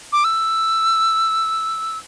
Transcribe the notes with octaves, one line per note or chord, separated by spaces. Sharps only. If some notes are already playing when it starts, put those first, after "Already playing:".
D6
E6